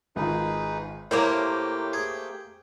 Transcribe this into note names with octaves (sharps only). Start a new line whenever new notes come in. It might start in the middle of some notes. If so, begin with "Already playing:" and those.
G#1 D#3 D#4 F4 G#4 B4
A2 F#3 A3 A#3 G4 A#4 C5 G5
G#4